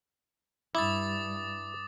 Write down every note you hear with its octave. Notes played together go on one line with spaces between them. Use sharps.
G2 E4 D6 D#6 A6